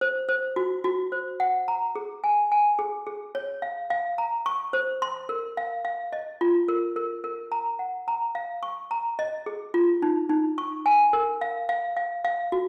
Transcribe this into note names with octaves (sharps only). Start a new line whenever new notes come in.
C5
C5
F#4
F#4
C5
F#5
A#5
G#4
G#5
G#5
G#4
G#4
C#5
F5
F5
A#5
C#6
C5
C6
A#4
F5
F5
D#5
F4
A#4
A#4
A#4
A#5
F#5
A#5
F5
C#6
A#5
D#5
G#4
F4
D#4
D#4
C#6
G#5
A#4
F5
F5
F5
F5
F#4